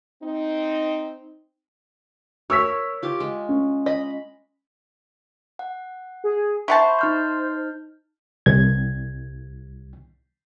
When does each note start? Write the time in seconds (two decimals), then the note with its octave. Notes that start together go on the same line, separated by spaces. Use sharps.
0.23 C4 D#4
2.50 A#4 C#5 C#6 E6 B6
3.03 F4 G4
3.20 G#3
3.49 C#4
3.86 D#5 B5
5.59 F#5
6.24 G#4
6.68 E4 C5 F#5 A5 B5 C#6
6.99 D#4 F6 G6
8.46 C2 G#6